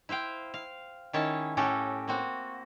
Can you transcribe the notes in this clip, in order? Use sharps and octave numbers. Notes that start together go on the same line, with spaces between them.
E4 C5 F5 G5
F5
D#3 G#3 C#4 E4 C#5 A5
A2 C#4 F#4 G4 A4
A#3 C4 F#4